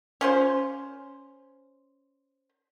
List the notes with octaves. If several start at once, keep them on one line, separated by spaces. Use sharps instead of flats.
C#4 F4 C5